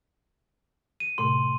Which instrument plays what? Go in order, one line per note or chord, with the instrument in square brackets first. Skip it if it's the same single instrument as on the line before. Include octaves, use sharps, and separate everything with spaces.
[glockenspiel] D#7
[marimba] A2 C3 A3 [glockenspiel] C6